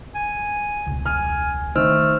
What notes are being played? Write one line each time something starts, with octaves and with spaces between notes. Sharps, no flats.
G#5
E1 C#2
G#5 F6
D#3 A3 C5 E6 F6